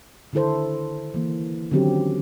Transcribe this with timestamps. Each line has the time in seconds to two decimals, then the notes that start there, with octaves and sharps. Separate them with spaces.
0.33 D3 D#3 E4 A4 C5
1.14 E3 A#3
1.71 D3 D#3 F#3 C4 C#4 G4